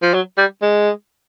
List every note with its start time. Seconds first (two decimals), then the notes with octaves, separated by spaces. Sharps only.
0.02 F3
0.14 F#3
0.38 G3
0.62 G#3